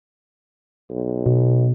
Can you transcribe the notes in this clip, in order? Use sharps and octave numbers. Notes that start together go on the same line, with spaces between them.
B1
B2